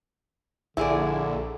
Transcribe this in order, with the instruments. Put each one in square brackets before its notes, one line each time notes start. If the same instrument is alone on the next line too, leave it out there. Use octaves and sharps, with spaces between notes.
[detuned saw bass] A#1 [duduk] D3 [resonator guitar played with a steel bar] E4 G#4 D5